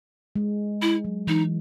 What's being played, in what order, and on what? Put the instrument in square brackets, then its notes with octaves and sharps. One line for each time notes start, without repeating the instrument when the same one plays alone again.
[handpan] G#3
[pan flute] E4
[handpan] F#3
[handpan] E3 [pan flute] D#4